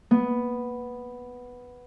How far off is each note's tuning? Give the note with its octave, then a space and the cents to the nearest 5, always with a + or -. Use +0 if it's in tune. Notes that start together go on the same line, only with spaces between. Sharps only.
B3 +0